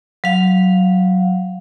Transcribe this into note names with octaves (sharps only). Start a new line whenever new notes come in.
F#3 F5